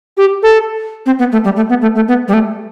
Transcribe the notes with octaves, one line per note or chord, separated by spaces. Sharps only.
G4
A4
C4
B3
A3
G3
A3
B3
A3
A3
B3
G3
A3